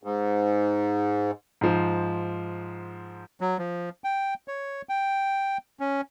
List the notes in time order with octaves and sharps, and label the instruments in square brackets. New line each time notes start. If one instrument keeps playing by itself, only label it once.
[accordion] G#2
[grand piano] G#2 F3
[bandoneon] F#3
F3
G5
C#5
G5
C#4